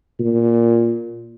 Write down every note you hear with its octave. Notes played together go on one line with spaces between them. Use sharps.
A#2